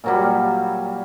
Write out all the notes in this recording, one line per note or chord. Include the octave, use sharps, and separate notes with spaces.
A#2 F#3 G3